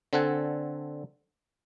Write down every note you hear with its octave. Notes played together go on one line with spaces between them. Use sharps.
D3 C4 A4 F#5 G#5